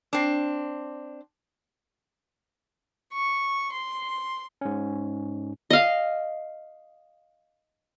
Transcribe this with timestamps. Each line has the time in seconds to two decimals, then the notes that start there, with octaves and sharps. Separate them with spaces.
0.13 C4 D4
3.13 C#6
3.73 C6
4.61 G#2 C#4
5.70 D#5 F5